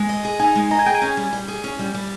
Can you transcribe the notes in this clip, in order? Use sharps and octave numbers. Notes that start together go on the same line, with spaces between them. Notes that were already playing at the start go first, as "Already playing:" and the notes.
Already playing: G#3
D#5
G#4
D#4 G#5
G#3
D#5 A#5
G#5
G#4 G5
G#5
C#4
G3
G3
G#4
C#4
G3
G3